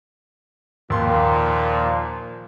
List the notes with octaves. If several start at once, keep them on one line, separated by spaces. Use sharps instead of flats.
D#2 A#2 F3 C6